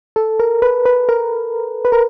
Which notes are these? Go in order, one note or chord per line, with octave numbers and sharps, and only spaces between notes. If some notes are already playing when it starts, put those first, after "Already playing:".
A4
A#4
B4
B4
A#4
B4
A#4